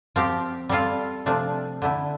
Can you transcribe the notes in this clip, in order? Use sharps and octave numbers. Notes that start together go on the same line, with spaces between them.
F3 C4 G4
G3 C4 F4 A4
C3 F3 A3 D4
D3 A3 E4